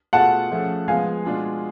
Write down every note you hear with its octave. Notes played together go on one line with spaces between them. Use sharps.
B2 A3 F4 G#4 F#5 A5
F3 A3 C#4 G#4
F3 G#3 B3 F5 G#5
B2 G#3 D4 F4 G#4